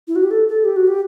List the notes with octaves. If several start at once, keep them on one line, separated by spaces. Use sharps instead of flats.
E4
F#4
G4
A4
A4
G4
F#4
G4